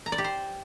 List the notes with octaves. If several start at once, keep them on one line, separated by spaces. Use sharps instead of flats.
A#5
D5
G4
C5